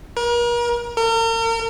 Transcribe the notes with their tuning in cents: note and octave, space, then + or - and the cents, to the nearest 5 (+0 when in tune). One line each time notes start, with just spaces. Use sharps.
A#4 +40
A#4 -40